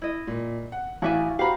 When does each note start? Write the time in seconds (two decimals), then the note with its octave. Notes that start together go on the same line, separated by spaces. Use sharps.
0.02 E4 D#5
0.27 A#2
0.72 F#5
1.02 A1 E4 F#4 E5 F5 G#5
1.39 F#4 G4 C5 F5 A#5 B5